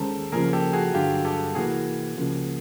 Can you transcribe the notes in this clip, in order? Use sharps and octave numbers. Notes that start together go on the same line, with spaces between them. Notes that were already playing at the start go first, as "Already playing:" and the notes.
Already playing: D#2 D#3 G#3 C#4 A4 A#4 C5
C#3 F3 A#3 G#4 A#4
G4 A4
F#4 G#4
G2 D3 F#3 F4 G4
G4 A4
C3 E3 G3 A#3 F#4 G#4
C#2 C#3 F3 A#3